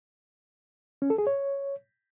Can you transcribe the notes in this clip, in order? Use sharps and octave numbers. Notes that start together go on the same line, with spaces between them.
C#4
A4
G#4
C#5